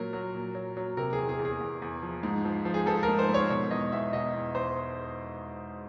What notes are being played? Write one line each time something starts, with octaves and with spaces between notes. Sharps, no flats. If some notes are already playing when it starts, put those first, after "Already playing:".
Already playing: A#2 F#3 A#4
F#3
A#2
F#3
F#3
C3 A#4
G#4
E2
G#4
E2
G#4
E2
E2
F3
G#2
F3
F3
G#4
F3 A4
A#4
G#2
C5
G#2
C#5
B2 C#5
E2 D#5
E2 E5
B2 D#5
E2
E2 C5